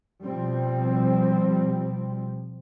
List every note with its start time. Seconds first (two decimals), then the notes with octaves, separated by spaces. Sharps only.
0.25 B2 F3 G3 C4